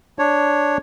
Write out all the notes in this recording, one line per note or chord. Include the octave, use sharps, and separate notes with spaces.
D4 C#5